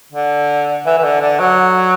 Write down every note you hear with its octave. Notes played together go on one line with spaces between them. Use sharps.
D3
E3
E3
D3
D3
F#3